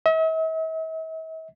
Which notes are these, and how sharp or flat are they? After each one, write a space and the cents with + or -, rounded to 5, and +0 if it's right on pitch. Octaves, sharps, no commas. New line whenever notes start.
E5 -45